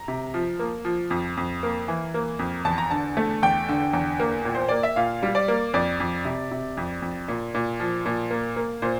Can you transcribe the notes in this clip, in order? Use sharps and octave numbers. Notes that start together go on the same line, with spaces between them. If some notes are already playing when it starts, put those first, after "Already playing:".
Already playing: A#5
C3
F3
A#3
F3
F2
F2
A#3
E3
A#3
F2
E2 A5
A#5
D3 A5
A3
E2 G5
D3
E2
A#3
A#2
C5
A#3 D5
E5
A#2 F5
G3
D5
A#3
F2 D5
F2
C3
C3
F2
F2
A#2
A#2
F3
A#2
A#3
A#3
A#2 C5